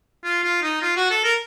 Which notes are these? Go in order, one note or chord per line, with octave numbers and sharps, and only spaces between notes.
F4
F4
D#4
F4
F#4
A4
A#4